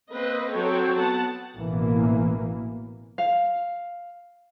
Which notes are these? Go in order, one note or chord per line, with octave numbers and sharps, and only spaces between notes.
A#3 C4 B4 D#5
F#3 C4 F#4 A4 C#5 G5
B3 F#5 A5
A1 B2 E3 A#3
F5